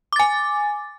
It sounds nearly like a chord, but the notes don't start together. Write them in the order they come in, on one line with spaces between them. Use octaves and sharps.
D6 A6 G#5